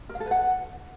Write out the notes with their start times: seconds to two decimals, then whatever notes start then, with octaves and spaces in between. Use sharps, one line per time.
0.09 A#4
0.15 F5
0.20 A4
0.26 B4
0.31 F#5